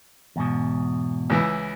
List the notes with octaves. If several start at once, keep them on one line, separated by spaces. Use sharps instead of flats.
E2 G#2 B2
C#2 E3 E4